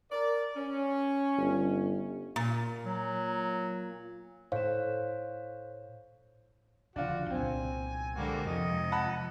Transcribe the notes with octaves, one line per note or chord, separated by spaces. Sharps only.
A#4 D5
C#4
G1
A#2
F#3
A2 C5 C#5 F5 E7
D1 C#3 F3 D4 F4 F#4
C2 A#2 F#3 C4 G#5
G#2 D3 G3 A#3 F#4
F2 C3 F3 G#3 D#5
F#5 A5 B5